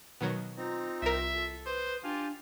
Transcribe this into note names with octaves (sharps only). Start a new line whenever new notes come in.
B2 D#3 F#3
C4 D#4 F4 A#5
C2 A#4 E5
A4
B4 C5 D#6
D4 F4 G4 G#5 A5